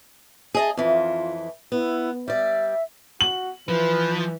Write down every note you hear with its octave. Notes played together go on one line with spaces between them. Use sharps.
G#4 D#5 A5
F2 E3 F4
B3 E4
G3 D5 E5
F#4 F#7
E3 F3 B4